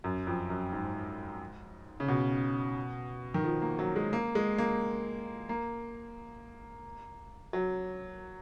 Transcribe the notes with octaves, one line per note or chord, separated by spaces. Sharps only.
F#2
F2
F#2
G#2
C#3
B2
D#3
F3
A#3
F#3
G#3
A#3
G#3
A#3
A#3
F#3